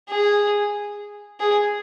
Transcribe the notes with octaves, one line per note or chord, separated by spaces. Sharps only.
G#4
G#4